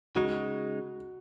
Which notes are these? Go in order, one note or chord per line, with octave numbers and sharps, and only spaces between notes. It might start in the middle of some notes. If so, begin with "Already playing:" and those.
C#3 G#3 D#4 F#4